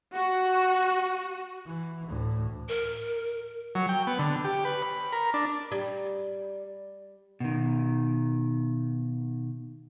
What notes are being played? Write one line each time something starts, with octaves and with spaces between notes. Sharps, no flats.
F#4
E3
D2 A2
A#4
F#3
G5
B3
D3
G4
B4
B5
A#4
D4
G3
B2 D#3